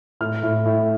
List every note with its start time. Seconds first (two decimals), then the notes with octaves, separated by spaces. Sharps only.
0.21 A2 F6
0.43 A2
0.65 A2